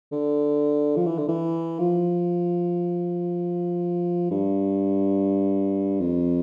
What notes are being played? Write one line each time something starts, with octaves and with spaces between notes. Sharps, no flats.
D3
F3
E3
D3
E3
F3
G2
F2